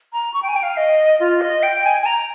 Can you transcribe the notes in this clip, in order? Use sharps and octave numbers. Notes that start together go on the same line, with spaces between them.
A#5
C#6
G5
G#5
G5
F5
D#5
F4
D#5
G5
G#5
G#5
A#5